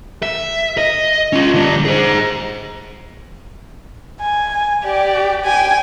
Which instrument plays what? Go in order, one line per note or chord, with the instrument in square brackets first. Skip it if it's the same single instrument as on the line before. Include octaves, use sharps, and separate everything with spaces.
[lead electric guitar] E5
D#5
C#4 F4
D3 G3
G#4 C5
[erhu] G#5
[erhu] G4 [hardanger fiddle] D5
[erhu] G5 [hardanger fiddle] G#5